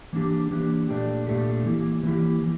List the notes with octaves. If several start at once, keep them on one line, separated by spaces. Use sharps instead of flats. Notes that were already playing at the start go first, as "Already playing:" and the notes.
E3 A#3 D4 G4
E3 A#3 D4 G4
A#2 A3 D4 G4
A#2 A3 D4 G4
E3 A#3 E4 G4
E3 A#3 E4 G4
E3